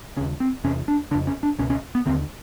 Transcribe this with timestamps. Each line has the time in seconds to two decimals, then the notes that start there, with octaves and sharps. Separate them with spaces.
0.17 C#3 C#4
0.20 D#2
0.40 C4
0.64 E2 C3 C#4
0.88 D4
1.11 C#3 D4
1.15 F2
1.27 C#4
1.43 D4
1.59 C#2 B2 C#4
1.70 C#4
1.95 B3
2.06 D#2 D3 C4